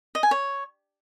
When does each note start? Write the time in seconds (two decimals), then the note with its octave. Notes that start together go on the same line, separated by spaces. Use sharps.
0.15 D#5
0.23 G#5
0.31 C#5